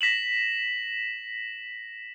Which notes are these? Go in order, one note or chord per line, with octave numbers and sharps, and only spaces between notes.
A#6 B6 E7 F#7